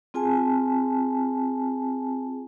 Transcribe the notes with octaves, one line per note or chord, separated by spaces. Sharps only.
C4 F4 G#4 G#5 A5